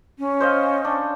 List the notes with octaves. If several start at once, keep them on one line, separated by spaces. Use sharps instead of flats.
C#4
C5 D#5 F5
D4